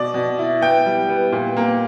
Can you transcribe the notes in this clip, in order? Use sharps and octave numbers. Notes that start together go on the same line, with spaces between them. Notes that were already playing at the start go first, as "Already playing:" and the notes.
Already playing: B2 D5
B2
E4
B3 G5
G3
B3
A#2
A#3